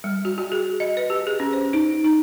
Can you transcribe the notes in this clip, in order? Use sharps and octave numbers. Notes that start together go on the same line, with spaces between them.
G3
F#4
F#4
G#4
D#5
B4
G4
G#4
C#4
C5
D#4
D#4